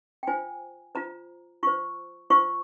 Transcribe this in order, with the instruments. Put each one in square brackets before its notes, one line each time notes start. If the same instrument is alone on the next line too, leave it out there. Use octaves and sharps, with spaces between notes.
[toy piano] G5
F4 C5 G#5
F4 C5 A#5
F4 C5 C#6
F4 C5 C#6